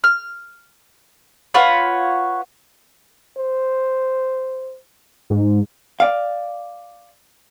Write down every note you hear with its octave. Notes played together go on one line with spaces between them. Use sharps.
F6
F4 B4 C#5 F#5
C5
G#2
D5 F5